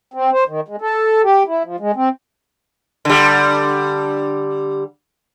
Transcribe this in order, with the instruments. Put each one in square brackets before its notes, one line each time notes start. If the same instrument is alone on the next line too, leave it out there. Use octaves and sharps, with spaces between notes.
[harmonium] C4
C5
D#3
G#3
A4
G4
E4
F3
G#3
C4
[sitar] D3 G3